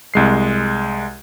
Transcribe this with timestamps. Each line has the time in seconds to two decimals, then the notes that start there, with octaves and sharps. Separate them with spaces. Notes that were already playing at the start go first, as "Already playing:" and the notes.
0.14 C2 G#3 C7